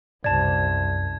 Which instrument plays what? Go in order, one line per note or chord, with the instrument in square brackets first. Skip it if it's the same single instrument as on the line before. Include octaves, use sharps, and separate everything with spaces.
[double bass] C2 C3 [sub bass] F#2 [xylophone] D5 A5 [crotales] G#6